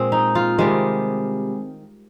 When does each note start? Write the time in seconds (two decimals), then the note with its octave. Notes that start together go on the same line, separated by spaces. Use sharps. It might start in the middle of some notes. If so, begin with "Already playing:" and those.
Already playing: A#2 G#3 C4
0.12 D#4
0.35 F4
0.58 C3 D#3 G3 G#3